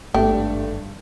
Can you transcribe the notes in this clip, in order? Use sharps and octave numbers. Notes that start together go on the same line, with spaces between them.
G#1 G2 A3 G4